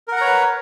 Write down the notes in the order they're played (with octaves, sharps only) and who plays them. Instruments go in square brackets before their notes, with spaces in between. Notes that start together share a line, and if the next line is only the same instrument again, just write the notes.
[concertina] A#4
F#5
A#5
C#5
B4